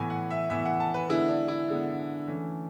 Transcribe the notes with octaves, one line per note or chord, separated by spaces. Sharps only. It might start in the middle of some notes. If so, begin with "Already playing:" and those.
Already playing: A2 E3 B3 G#5
F#5
E5
A2 E3 B3 E5
F#5
A5
B4
D3 G#3 B3 E4
D4
E4
D3 G#3 B3
E3 A3 C#4